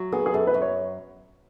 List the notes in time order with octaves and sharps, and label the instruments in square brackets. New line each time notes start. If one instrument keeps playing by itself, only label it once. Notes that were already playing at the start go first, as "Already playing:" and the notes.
Already playing: [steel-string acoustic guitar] F#3
[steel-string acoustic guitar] B3 [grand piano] G#4
[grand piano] G#4
[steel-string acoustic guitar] F#2 [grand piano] A4
[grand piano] B4
[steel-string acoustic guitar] F#2
[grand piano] C#5